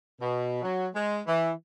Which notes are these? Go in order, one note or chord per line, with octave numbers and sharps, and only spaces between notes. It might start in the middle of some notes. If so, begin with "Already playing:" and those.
B2
F#3
G#3
E3